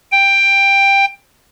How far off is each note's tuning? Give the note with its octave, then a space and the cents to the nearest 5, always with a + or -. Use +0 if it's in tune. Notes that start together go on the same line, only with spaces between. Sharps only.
G5 +10